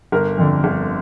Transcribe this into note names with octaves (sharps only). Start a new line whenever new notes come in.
G1 A#4
F2 D3
G1